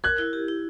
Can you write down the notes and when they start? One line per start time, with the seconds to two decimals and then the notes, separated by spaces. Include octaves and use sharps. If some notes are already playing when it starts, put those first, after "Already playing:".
0.04 A#4 F#6 G#6
0.18 E4
0.33 G4
0.48 E4